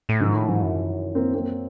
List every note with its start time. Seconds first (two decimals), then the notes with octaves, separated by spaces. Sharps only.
0.09 A2
0.20 G#2 D#3 F3
0.35 A2
0.48 G#2 E3 F#3
0.62 F#2
1.15 A#3 C4
1.34 A#3 C4